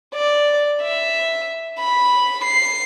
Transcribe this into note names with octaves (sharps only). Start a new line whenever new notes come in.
D5
E5
B5
C7